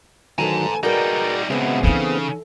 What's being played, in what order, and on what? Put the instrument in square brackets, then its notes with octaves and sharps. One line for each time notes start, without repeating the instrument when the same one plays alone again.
[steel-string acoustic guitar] D2 E3 A4 [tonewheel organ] D#3 F#3 [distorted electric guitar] G#5 A#5
[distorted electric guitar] G3 D#4 [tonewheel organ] F#4 G#4 D5 [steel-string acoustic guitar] A#4 B4 A#5
[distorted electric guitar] C#2 B2 [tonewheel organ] B3 C4 G#4 [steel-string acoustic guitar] E5 F#5
[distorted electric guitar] C#3 [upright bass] E3 D#4 [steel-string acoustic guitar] A4